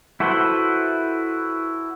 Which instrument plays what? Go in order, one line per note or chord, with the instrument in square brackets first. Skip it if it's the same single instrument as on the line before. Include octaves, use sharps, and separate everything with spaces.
[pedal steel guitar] E4 F#4 A4 B4 C5